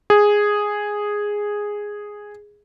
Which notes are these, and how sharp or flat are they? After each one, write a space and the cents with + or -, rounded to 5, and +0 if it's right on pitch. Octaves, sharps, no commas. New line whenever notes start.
G#4 -5